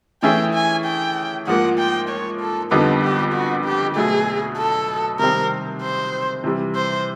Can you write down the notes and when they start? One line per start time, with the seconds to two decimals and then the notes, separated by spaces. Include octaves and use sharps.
0.22 E3 A3 C#4 E4 G#4 G5
0.54 G#5
0.85 G5
1.47 G#2 F3 A#3 F#5
1.79 G5
2.09 C#5
2.41 A4
2.71 F2 D3 G3 B3 D#4 A4
3.02 G4
3.33 F#4
3.65 G4
3.96 B2 F#3 A3 G#4
4.57 A4
5.19 C3 D#3 G3 C4 A#4
5.83 C5
6.44 C3 E3 G3
6.75 C5